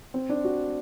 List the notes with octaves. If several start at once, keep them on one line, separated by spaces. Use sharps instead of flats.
C4
D4
F#4